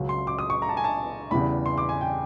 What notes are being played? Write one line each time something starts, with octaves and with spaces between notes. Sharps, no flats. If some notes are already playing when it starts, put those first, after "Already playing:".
Already playing: C#2 C#3 F#3
C6
D6
D#6
C#6
A#5
A5
G#5
A5
E2 C#3 E3 G3 B5
C6
D6
G#5
G5